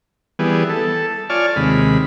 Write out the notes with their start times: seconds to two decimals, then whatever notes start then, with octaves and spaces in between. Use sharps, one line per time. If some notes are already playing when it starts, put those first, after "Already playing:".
0.39 E3 G3 B3 G#4
0.69 A4
1.30 F4 C#5 D5 G#5 A5 F6
1.56 D#2 C3 G#3 B5